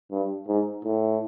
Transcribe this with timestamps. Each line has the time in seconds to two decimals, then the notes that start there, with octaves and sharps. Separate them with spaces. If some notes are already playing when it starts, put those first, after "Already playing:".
0.11 G2
0.48 G#2
0.85 A2